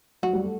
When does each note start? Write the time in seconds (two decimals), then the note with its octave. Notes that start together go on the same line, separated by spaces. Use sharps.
0.23 F#3 F#4
0.33 G3
0.44 A3